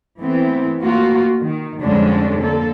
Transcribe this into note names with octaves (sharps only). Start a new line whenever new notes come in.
E3 A3 B3 C4
A3 A#3 F4 F#4
D#3
F2 D3 G3 G#3 C#4 D4
D3 A#3 A4